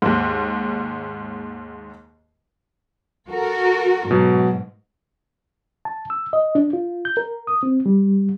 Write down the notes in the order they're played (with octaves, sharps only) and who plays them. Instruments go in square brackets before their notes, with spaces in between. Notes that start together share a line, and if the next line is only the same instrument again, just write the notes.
[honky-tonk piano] D#2 G#2
[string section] F#4 A4 A#4
[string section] G#2 [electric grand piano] B2 F#3
[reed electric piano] A5
E6
D#5
D4
F4
G6
A#4
D#6
C4
G3